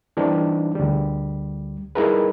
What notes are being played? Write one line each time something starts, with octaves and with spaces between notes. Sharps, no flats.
E3 G3 C4 D4 D#4
D2 G3
G3 D#4 E4 G#4 A#4 B4